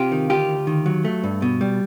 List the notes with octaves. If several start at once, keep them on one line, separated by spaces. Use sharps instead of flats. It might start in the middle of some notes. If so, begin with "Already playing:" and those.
Already playing: C3 F4 G4
D#3
D2 F4 G4
D2
D#3
F#3
A3
G2
B2
G3